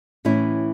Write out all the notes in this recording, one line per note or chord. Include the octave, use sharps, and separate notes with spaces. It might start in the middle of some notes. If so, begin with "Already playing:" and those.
A2 E3 C#4 E4